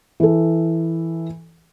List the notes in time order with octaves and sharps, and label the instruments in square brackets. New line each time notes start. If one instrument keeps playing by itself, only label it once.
[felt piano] E3 A4